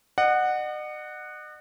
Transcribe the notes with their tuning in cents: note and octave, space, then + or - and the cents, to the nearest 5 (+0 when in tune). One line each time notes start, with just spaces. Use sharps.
D#5 -40 F#5 +0